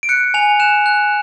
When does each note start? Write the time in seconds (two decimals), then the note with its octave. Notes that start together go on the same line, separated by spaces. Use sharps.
0.03 D7
0.09 F#6 C#7
0.34 G#5 F7
0.60 F#6 E7
0.86 F#6